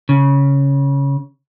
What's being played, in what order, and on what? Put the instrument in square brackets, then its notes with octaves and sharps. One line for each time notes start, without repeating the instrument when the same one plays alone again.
[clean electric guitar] C#3